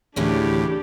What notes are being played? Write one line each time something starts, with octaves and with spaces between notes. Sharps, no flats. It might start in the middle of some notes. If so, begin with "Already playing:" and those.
D2 A2 C#3 E3 C#4 D4 G4